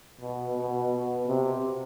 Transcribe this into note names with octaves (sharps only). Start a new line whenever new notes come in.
B2
B2
B2
C3